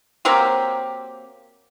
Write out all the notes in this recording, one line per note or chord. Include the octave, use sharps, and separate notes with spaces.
F#3 A#3 C4 G4